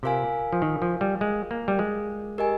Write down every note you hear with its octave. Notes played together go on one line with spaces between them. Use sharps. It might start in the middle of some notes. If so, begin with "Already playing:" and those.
C3 F4 A#4 F5 G#5
F3
D#3
F3
G3
G#3
A#3
G3
G#3
G4 A#4 D#5 G#5